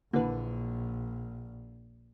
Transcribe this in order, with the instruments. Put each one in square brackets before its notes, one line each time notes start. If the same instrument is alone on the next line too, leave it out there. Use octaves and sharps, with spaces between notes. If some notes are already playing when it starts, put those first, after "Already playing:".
[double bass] A#1 [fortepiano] D3 E3 [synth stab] A#3 B4